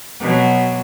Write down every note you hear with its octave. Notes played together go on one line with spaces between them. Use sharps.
B2 F#3